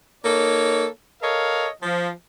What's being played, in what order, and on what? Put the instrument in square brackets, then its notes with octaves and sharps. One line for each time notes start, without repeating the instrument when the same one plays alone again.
[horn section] A#3 D#4 A4 C#5
A4 A#4 C#5 D#5 F5
F3